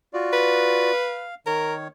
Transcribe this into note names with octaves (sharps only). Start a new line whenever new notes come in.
F4 F#4 D5
B4
F5
D#3 A#4 C#5